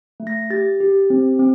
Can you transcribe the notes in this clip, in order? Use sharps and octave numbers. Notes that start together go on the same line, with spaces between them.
A3
A#6
G4 A6
G4
C4
C4